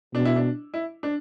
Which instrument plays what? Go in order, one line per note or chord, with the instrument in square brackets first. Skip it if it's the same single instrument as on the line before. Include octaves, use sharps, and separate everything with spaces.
[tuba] B2 [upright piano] D4
[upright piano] E4
D4
E4
D4